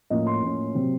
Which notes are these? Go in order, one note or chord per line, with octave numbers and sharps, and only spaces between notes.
A2 F3 A#3 C#4 D#5
C6
A2 F3 A#3 C#4
C3 F#3 C4